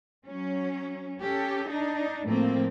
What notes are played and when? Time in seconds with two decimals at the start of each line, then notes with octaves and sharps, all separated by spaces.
0.23 F#3 C#4
1.21 C#4 G4 A4
1.67 D4 D#4
2.24 A2 F3 A3 A#3 C4